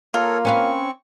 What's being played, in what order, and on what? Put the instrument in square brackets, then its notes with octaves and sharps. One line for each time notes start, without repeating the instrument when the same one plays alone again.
[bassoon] A#3 [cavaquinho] F4 [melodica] A4 A#4 C#5
[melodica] C4 C#6 [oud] C#4 B4 F5